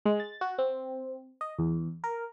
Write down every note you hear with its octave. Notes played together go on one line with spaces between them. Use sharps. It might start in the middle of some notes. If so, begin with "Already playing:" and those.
G#3
A6
F#4
C4
D#5
E2
A#4